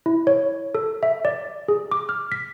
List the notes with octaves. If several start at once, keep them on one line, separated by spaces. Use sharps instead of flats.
E4
C#5
A4
E5
D5
G#4
D6
F6
B6